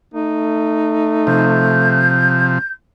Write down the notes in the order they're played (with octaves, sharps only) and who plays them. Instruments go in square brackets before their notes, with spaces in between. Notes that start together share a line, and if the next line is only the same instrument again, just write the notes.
[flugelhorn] A3 [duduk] D#4
[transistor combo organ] C3 F3 [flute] G6